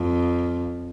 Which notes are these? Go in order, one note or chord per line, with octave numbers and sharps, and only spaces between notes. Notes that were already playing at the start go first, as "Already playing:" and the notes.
Already playing: F2